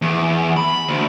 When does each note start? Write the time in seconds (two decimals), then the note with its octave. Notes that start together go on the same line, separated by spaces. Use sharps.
0.02 E2
0.57 B5
0.89 D2